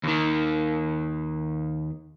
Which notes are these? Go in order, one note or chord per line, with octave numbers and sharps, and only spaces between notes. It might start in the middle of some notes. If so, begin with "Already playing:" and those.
D#2 D#3